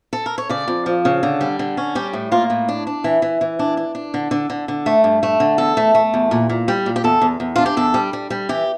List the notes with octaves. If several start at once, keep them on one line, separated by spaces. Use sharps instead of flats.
A4
A#4
C#5
C#3 D5
F2
F3
C#3
D3
G3
D3
C#4
G3 G4
A2
A#3 F4
A2
D4
D4
E3
E3
E3
D4
D4
D4
D3
D3
D3
D3
A3
G2
A3
D3
E2 A4
A3
A3
E2
A#2
A#2
G3
A#2
G4
E2 A4
E2
E2
D4 F4
G4
E2 A4
G3
G3
G3
E3 G4